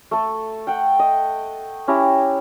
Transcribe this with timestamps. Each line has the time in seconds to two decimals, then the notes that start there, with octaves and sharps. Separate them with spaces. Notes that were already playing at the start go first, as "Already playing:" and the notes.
0.11 A3 A4
0.67 F#5 G5
0.99 D#5
1.87 C#4 E4 G4 A#5